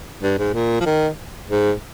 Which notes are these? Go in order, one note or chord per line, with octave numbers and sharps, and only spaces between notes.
G2
G#2
A#2
F3
D#3
G#2